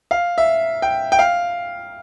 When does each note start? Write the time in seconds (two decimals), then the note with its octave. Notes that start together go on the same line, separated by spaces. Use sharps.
0.11 F5
0.38 E5
0.82 G5
1.12 G5
1.19 F5